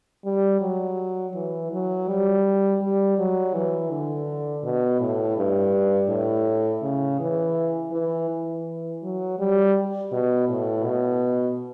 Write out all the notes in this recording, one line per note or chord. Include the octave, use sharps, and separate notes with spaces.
G3
F#3
E3
F#3
G3
G3
F#3
E3
D3
B2
A2
G2
A2
C#3
E3
E3
E3
F#3
G3
B2
A2
B2